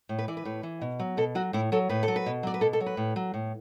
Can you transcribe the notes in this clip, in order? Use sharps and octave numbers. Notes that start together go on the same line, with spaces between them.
A2
B4
E3 D5
B4
A2
E3
B2
F#3
B2 A4
F#3 F#4
A2 E4
F#3 A4
A2 B4
A4
F#3
B4
B2
F#3 D5
B4
B2 A4
A4
F#3
B4
A2
F#3
A2